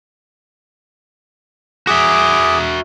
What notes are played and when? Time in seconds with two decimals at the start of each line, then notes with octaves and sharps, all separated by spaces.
1.87 F#4 G#4 E5 D6